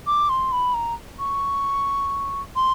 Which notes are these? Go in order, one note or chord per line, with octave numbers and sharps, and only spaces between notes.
D6
C6
B5
A#5
C#6
C6